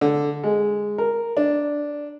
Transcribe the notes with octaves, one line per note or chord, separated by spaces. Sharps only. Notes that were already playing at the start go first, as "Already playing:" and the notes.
D3
G#3
A#4
D4